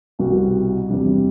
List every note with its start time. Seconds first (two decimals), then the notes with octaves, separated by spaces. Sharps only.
0.19 C2 B2 G3 C4 F#4
0.89 E2 C3 G3 D4